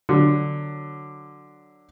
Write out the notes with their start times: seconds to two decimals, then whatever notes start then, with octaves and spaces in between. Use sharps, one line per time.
0.09 D3 F#3